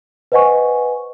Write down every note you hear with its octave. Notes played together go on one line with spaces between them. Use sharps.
B4 C5 D#5 F#5 G#5 C#6